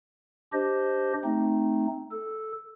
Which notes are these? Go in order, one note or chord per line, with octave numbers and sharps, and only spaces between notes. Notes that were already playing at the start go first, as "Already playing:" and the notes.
D4 G4 C5 D#5
A3 C4 D#4
A4